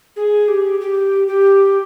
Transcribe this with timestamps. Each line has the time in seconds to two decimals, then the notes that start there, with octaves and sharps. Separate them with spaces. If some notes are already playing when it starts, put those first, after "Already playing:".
0.16 G#4
0.48 G4
0.80 G4
1.28 G4